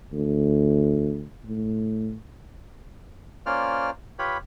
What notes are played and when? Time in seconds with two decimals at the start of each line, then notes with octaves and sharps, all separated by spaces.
0.13 D2
1.46 A2
3.46 A#3 C#4 F4 C5 D5 F6
4.19 F4 G4 B4 C#5 B5